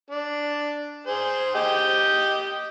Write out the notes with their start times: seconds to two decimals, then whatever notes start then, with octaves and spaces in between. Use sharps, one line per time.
0.11 D4
1.07 G#4 C5
1.55 G4 D#5 G5